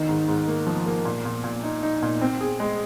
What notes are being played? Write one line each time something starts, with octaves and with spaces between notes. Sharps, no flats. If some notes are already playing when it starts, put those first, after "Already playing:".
Already playing: D#3 D#4
G#2
G#2
A#3
F3
A#3
A#2
A#2
A#2
D#4
D#4
A#2
C4
G#4
G#3